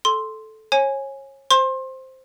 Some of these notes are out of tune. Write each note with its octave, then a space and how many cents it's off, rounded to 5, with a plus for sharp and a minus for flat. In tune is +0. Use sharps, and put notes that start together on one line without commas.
A4 -10 C6 +0
C#5 -30 G#5 +0
C5 +0 C6 +25